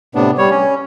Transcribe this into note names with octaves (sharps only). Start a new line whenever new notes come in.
A2 C3 B3 D4
G3 C#5
C#4